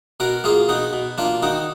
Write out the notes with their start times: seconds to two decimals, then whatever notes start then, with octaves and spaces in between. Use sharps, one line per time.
0.20 B2 F#4 A#4
0.44 A#3 F4 G#4
0.69 B2 D#4 F#4
0.93 B2
1.18 A#3 D4 F4
1.43 D#3 D#4 F#4